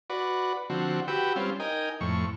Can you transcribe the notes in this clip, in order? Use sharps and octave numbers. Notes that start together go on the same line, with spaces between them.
F#4 B4 D5
D3 F3 C4 F#4
F#4 G4 B4 G5 E6
G3 C4 C#4 F4
D#4 A#4 D#5 G5 G#5
F2 A2 C#6